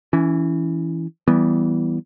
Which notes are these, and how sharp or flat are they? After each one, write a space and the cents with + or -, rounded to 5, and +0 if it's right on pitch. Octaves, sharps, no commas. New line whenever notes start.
E3 +0 C#4 +25
E3 -5 G3 -20 B3 +0